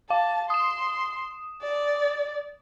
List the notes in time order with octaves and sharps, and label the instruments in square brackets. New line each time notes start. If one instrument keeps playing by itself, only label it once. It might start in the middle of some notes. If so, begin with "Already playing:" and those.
[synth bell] F5 [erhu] A5
[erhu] C6 [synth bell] D#6 E7
[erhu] D5